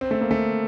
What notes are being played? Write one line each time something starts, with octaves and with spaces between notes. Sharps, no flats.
C4
A3
A#3
A3